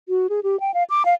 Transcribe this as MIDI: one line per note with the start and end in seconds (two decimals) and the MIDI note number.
0.09 0.27 66
0.29 0.40 68
0.43 0.59 67
0.60 0.74 79
0.74 0.83 77
0.90 1.03 86
1.05 1.14 77